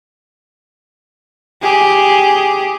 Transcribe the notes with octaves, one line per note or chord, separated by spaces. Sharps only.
G4 G#4